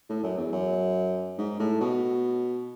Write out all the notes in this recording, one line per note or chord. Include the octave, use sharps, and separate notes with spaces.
A2
F#2
E2
F#2
G#2
A2
B2